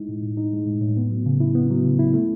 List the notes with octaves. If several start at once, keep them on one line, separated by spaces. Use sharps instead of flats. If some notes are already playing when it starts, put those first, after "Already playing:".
Already playing: G#3 D#4 E4
A2
A2
D#4
G#3
A2
A2
B3
F#3
C#3
E4
B3
F#3
C#3
E4
A3